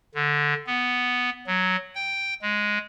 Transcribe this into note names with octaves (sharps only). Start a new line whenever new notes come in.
D3
B3
F#3
G5
G#3